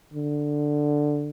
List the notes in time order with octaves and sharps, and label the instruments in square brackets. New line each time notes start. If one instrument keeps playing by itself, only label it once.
[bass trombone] D3